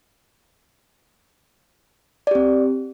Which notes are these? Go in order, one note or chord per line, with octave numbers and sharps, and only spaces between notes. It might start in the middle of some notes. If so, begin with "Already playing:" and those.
C4 G4 D5